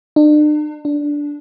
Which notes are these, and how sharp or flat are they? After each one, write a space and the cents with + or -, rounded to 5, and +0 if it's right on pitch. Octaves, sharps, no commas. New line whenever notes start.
D4 +40
D4 -10